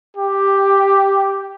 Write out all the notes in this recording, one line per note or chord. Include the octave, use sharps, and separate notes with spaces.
G4